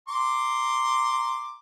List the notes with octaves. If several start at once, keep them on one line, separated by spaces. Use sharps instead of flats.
A#5 C6 D6